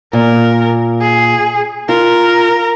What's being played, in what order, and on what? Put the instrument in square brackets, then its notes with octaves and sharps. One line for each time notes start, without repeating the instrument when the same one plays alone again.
[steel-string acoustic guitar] A#2 [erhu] A#4
[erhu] G#4
[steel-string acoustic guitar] F4 [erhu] A#4